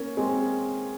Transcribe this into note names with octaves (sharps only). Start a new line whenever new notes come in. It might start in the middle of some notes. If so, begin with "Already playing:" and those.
Already playing: A#3 C#4
G#3 C4